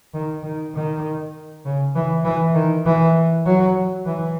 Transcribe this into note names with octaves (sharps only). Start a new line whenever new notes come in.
D#3
D#3
D#3
C#3
E3
E3
D#3
E3
F#3
E3